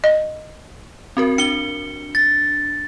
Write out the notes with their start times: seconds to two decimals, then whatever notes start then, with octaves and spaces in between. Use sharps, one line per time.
0.04 D#5
1.17 C4 F#4 A#4
1.38 D4 C#7 G7
2.15 A6